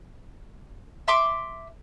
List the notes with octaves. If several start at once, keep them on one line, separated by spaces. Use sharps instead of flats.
E5 C6 D6